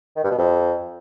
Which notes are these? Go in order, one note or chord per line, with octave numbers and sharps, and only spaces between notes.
D#3
G2
B2
F2